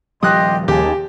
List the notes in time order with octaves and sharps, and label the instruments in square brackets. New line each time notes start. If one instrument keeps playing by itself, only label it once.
[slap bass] D#1 F3 G3 [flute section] G4 D#5 C6 [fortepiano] D#6 F#6
[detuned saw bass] D#2 [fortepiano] G4 [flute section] G#4 A5